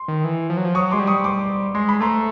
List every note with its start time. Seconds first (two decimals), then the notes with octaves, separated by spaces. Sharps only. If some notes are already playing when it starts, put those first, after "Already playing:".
Already playing: C6
0.08 D#3
0.24 E3
0.50 F3
0.57 F#3
0.65 F3
0.75 F#3 C#6 D#6
0.91 G#3 C6 D6
0.99 G3
1.07 C#6 D#6
1.24 C6 D6
1.74 G#3 C6
1.89 B5
2.00 A3 A#5 C6